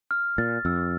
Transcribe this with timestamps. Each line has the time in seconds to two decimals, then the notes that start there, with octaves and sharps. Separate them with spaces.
0.11 F6
0.38 A#2 A6
0.65 F2 E6